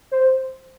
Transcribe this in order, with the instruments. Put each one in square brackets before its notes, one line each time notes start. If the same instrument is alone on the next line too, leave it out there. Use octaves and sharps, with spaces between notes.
[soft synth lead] C5